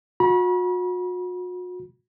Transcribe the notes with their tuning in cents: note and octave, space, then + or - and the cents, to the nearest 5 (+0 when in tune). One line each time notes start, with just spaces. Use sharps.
F#4 -40 B5 -40